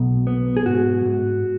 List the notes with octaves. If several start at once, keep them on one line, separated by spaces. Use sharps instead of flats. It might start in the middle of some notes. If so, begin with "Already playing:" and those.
Already playing: B1 B2
B3
G#4
G#2 F#4
G#2